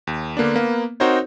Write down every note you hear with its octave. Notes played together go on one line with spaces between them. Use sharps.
D#2
D3 A#3 B3 D4
A#3 B3
C4 D#4 F#4 A#4 C5 C#5